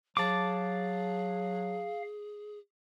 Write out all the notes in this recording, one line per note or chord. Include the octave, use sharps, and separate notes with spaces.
F#3 G#4 F5 A5 D6